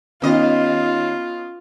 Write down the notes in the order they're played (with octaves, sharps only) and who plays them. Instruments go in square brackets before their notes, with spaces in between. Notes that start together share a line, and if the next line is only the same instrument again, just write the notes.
[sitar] D#2 D#5 [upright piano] B3 C#4 D#4 [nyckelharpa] F4